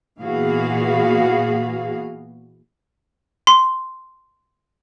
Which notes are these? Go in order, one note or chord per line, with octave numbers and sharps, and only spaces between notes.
A#2 E3 B3 F#4 G#4 F5
C6